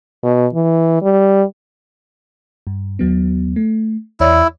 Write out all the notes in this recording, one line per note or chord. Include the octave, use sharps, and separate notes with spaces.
B2
E3
G3
G2
D#2 F#3 B3
A3
E2 E4 C#5 D5